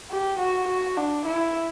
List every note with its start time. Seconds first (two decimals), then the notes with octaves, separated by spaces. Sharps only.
0.11 G4
0.39 F#4
0.68 F#4
0.97 D4
1.26 E4